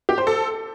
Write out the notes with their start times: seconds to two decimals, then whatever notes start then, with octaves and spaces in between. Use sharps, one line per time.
0.09 G4
0.18 C5
0.27 A4